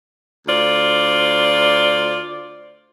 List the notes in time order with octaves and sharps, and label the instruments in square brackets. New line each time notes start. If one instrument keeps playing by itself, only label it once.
[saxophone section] D2 F4 C5 D5